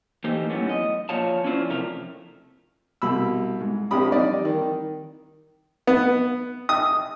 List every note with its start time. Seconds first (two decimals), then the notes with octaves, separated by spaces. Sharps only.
0.24 E3 A3 A#3 D#4 G4 C5
0.49 F#2 A2 B3 C#4
0.69 D#5
1.09 A#2 F3 C#5 F5 A5
1.44 C#4 D4 E4 F4 C5
1.69 C3 F3 A3 A#4
3.02 C2 B2 B5 E6
3.60 G#2
3.91 A#1 C4 D4 G4 B5 D#6
4.12 G3 C4 D#4 D5 D#5
4.45 D#3
5.87 B3
6.69 D#6